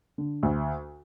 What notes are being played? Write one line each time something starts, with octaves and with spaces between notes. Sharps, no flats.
D3
D2